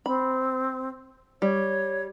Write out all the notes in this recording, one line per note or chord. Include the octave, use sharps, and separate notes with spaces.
C4 B5
G3 C#5